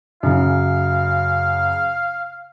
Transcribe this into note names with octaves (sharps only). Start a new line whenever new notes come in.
F#2 C#3 F5